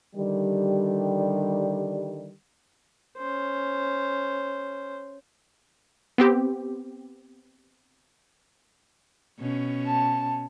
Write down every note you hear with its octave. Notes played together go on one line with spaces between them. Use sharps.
D3 D#3 G3
C#4 C5
B3 C4 G4
B2 C#4
A5